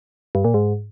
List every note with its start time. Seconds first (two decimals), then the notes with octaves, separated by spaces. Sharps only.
0.35 G2
0.44 A#2
0.54 G#2